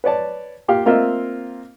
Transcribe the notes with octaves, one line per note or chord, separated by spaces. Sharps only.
B4 C#5 D5 A5
A#3 F4 G4 F5
A#3 C4 F4 A#4 D#5 E5